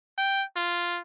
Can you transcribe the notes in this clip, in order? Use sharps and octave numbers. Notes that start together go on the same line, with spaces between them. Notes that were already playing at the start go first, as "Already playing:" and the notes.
G5
F4